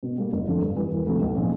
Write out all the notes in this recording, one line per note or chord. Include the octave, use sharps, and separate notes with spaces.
B2
G3 A#3
F#1
F2 D3 F3 A3
G2
E3 G3
E1
D2 C3 F3 A3
B1
A#2 F3 G#3 C#4